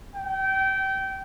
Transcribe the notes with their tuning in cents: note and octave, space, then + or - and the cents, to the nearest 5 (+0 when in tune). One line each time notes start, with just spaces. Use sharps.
G5 -25